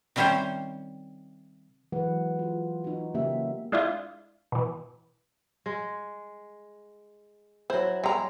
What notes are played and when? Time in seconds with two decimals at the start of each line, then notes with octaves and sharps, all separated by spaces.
0.16 C3 D#3 G3 C#4 G4 C5
1.92 E3 F#3 G#3 B4 F#5
2.39 F4
2.84 D#4 F#4
3.14 C#3 A#3 C#4 G4 E5
3.72 G#3 D4 E4 F4
4.52 B2 E3
5.66 G#3
7.70 F#3 E4 C5
8.04 G3 G#3 A#5